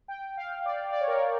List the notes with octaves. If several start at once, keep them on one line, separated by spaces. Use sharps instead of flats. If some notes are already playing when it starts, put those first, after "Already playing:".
G5
F5
D5
D5
C#5
A#4
C#5